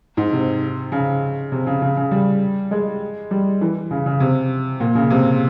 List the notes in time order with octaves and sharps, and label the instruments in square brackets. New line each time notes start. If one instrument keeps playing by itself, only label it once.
[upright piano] G#2
C3
C#3
C3
C#3
C#3
C#3
G3
G#3
G3
E3
C#3
C#3
C3
A#2
C#3
C3